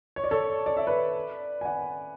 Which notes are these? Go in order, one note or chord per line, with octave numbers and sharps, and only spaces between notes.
C#5
D5
A4 C#5
D5
E5
B4 D5
G#5
D5 F#5